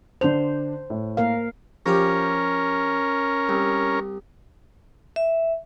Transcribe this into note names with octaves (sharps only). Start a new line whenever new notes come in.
D3 D4 C5 F7
A2
A#3 A#4 F5
F3 C#4 G4 A#4
C2
E5